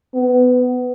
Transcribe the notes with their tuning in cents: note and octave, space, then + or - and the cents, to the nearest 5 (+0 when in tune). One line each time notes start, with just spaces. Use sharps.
B3 +20